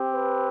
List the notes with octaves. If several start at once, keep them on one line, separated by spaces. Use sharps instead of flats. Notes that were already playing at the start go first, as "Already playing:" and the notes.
Already playing: C4 G4
B4